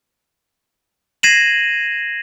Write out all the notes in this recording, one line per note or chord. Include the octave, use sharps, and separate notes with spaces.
G#6 A#6 C7 D#7 E7 F#7